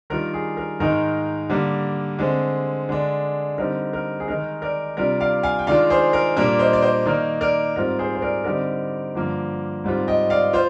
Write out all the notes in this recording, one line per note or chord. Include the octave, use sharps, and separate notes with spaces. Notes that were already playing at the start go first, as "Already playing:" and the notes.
D#3 G3 D4 F4 A#4
G#4
A#4
G#2 D#3 G#3 D#4 A#4
D3 G3 A#3
D3 G#3 C4
D3 G#3 D4
D3 G3 C4 D#4 A#4
A#4
G#4
D#3 G#3 D#4 A#4
A#4 D5
C3 G3 D4 F4 A#4 D5
D5 F5
F5 G#5
G5
D#3 G#3 D4 F4 D5 F5
G#4 C5
A#4
A#2 G3 A#3 D4 A#4
C5 D#5
D5
C5 D#5
D#3 A#3 D#4 A#4 D5
A#4 D5
G#2 G3 C4 F4 A#4
G#4 C5
C5
A#4 D5
D3 G3 C4 D#4 A#4 D5
G2 D3 F3 A#3
G#2 G3 C4 F4
D#5 G5
D5 F5
F4 C5